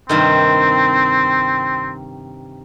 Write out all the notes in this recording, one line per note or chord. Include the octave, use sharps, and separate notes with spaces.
G2 C3 D#3 C4